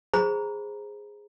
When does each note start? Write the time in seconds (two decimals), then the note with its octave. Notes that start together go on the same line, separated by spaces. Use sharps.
0.14 G#4 C5 A#5 B5